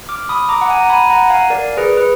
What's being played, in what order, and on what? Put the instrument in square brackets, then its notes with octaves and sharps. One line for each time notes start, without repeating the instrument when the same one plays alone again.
[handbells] D6 F6
B5 D#6
A#5 D6
F#5
G#5
A#5
G#5 B5
F#5 A#5
F5 G#5
A#4 D5
G#4 B4
B4